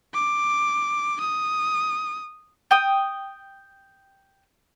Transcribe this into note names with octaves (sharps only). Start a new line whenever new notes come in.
D6
D#6
G5 D#6